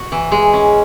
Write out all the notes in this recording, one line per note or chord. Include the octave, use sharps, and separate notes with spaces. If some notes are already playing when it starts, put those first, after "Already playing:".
Already playing: F#4
E3
G#3
C#4